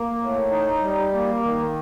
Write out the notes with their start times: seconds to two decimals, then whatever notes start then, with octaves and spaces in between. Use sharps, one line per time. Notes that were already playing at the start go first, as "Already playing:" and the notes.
Already playing: A#3
0.18 A2
0.49 D#4
0.81 G3
1.12 A#3
1.43 D#3